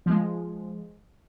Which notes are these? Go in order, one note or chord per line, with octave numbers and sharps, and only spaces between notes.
F3 G#3